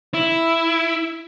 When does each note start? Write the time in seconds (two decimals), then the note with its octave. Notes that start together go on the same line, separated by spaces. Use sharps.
0.14 E4